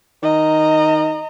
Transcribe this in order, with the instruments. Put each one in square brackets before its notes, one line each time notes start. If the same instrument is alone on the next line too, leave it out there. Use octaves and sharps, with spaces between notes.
[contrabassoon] D#3 [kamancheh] D#5 A#5